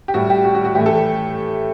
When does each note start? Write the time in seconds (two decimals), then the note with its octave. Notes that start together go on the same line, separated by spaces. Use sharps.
0.08 G4
0.14 A2 G3 F#4
0.30 G4
0.45 F#4
0.55 F#4
0.65 F#4
0.75 A2 E3 A3 G4
0.86 A4